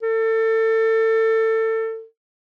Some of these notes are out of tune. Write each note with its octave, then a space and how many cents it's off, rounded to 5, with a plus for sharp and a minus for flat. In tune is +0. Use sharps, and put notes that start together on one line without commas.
A4 +25